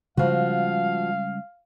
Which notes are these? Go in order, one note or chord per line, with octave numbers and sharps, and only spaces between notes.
C#3 F3 G3 G#3 F#4 F5